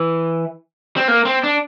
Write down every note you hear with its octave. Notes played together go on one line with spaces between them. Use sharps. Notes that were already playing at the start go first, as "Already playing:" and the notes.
Already playing: E3
C4
A#3
C4
D4